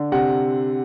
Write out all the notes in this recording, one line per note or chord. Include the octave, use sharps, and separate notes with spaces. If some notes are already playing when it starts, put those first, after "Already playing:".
Already playing: D3
C3 F#5